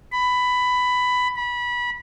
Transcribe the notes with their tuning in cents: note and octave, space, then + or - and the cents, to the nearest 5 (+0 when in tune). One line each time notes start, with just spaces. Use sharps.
B5 +10
B5 -25